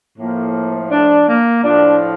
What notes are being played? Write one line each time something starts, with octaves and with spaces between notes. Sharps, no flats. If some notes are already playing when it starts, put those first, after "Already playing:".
A2 F3 A#3
D4
A#3
A2 F3 D4